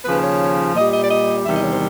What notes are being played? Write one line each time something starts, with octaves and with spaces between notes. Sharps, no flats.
D#2 C#3 F3 B4
C#5
A#2 G3 D#5
D#5
D5
D#5
E2 C3 D#3 G3 E5
D#5
C#5
C5